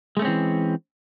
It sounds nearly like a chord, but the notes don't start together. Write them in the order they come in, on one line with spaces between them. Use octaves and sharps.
G#3 A3 C#4 C4 E3